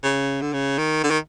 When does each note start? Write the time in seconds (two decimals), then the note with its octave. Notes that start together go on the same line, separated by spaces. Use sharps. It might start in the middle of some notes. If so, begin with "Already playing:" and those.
0.03 C#3
0.42 D3
0.53 C#3
0.78 D#3
1.03 D3
1.10 D#3